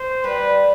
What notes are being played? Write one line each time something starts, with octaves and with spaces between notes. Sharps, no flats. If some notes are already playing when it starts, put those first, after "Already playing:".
Already playing: C5
G3 B4